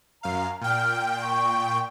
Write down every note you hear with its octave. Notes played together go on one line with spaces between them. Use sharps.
F#2 F5 A#5
A#2 G5 F6
C#6